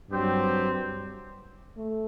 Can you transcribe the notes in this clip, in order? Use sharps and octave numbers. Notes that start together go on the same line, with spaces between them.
G2 F#3 C4 G4
A3